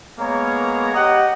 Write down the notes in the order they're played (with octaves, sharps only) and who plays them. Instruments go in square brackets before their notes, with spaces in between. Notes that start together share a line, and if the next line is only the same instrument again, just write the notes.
[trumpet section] G#3 A#3 B3 C#5 A#5
G4 D#5 F#5